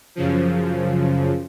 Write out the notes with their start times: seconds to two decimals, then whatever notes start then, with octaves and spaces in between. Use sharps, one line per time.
0.15 F#2 C#3 F3